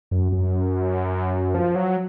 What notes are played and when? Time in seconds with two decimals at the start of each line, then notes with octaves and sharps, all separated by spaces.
0.11 F#2
0.32 F#2
1.54 F3
1.75 F#3